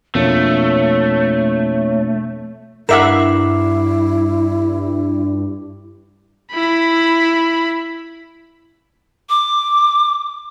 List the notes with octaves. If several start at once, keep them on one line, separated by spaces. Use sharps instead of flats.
F2 B2 A3 A#3 D4 C#5
G2 E4 A#4 E5 F#5 D6 C7 E7
E4 B5
D6